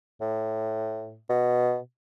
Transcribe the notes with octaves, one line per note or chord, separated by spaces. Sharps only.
A2
B2